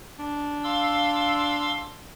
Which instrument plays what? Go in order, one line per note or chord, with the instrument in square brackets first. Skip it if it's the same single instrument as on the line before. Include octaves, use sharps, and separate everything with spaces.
[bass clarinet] D4
[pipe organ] F5 C6 E6